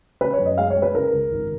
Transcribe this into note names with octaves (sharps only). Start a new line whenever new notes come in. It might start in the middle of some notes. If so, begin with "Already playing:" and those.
C#3 B4
C#5
F#2
D#5
G#3 F5
C#5
G#3
B4
C#3 A#4
C#2
G#1